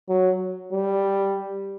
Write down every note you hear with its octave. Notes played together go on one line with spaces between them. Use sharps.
F#3
G3